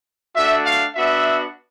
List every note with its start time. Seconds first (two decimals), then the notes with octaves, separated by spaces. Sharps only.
0.36 A3 D4 F#4 E5
0.66 F5
0.96 B3 D4 F#4 E5